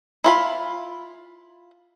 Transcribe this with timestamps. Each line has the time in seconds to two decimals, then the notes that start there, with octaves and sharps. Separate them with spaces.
0.24 E4 F4 B5